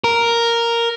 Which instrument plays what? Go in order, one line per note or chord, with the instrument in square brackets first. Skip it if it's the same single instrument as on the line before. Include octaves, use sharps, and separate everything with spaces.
[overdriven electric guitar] A#4